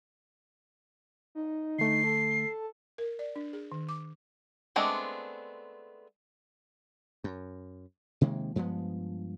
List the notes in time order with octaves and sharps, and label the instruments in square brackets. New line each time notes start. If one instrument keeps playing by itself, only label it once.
[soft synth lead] D#4
[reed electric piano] D3 A3 [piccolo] C7
[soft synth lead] A4
[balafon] A#4
D5
D4
G#4
D#3
D6
[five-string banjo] G#3 A3 B3 C4 D4
[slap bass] F#2
C3 D#3 G#3 A#3
G2 F3 G#3 B3